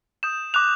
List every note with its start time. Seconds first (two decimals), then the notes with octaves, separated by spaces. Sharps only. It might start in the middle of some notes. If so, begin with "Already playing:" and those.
0.23 D#6 G6 E7
0.54 D6 F#6 F7